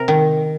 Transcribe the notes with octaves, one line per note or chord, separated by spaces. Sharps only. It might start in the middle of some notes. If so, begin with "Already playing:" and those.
Already playing: C3 A#4
D#3